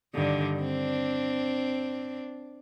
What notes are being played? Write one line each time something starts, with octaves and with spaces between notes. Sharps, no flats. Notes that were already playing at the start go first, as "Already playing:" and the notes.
G2 D3 D#3
C4 D4